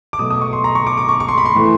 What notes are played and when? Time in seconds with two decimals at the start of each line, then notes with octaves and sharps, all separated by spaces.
0.13 D6
0.19 B2 F#3 A3 D#6
0.30 D#6
0.41 C#6
0.53 C6
0.64 A#5
0.75 C#6
0.87 D6
0.98 D6
1.09 C#6
1.20 C#6
1.28 C6
1.38 B5
1.45 C6
1.54 A2 E3 A3